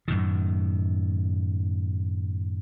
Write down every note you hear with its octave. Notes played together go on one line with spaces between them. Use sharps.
F#2 A2 D#3